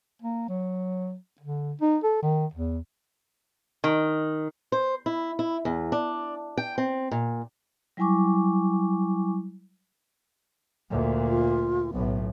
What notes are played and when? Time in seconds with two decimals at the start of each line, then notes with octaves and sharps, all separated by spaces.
0.22 A#3
0.48 F#3
1.40 D3
1.81 D#4
2.03 A4
2.23 D#3
2.54 E2
3.84 D#3
4.72 C5
5.06 E4
5.39 E4
5.65 E2
5.92 D4
6.58 G5
6.78 C4
7.11 A#2
7.97 F#3 G3 E4 G#5 C#6 D6
10.90 D2 A#2
11.28 F4
11.94 B1 A2 B3